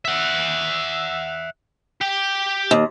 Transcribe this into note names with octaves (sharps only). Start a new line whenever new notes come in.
E5 F#5
G4 G5
D#2